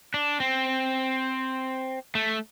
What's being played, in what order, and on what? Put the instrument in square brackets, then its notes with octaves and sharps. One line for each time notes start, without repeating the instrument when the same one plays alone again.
[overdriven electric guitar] D4
C4
A3